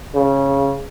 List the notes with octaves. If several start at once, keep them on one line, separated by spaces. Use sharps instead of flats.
C#3